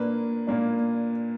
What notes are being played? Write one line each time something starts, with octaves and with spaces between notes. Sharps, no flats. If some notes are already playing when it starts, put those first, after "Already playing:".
Already playing: A#2 A#3 D4 B4
A#2 A#3 D4